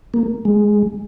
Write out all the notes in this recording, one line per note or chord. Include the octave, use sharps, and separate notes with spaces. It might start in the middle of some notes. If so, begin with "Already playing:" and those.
A#3
G#3